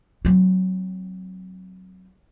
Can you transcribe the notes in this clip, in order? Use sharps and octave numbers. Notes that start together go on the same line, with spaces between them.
F#3 C4